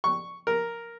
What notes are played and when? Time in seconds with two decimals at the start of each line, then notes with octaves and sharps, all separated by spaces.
0.04 C#6
0.47 A#4